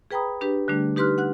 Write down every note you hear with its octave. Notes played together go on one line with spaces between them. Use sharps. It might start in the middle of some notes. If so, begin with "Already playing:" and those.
G#4 B4 G5 A#5 B5 D#6
D4 G4 B4
D3 G3 A3 D4
D#4 G4 B4 C6 F6 F#6
F#5 F#6